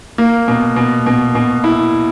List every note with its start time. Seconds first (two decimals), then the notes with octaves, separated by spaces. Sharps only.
0.18 A#3
0.48 B2
0.76 B2
1.06 B2
1.35 B2
1.64 E4